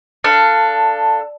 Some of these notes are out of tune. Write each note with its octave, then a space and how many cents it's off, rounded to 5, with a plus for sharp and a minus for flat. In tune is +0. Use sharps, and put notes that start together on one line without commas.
D4 +5 A4 +15 F5 -15